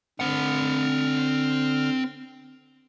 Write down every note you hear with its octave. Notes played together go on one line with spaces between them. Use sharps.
D3 C4 F#5 F6